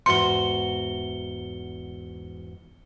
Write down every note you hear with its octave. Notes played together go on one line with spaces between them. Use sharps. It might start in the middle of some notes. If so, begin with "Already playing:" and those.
E2 G#2 F#4 C6 C#7 G7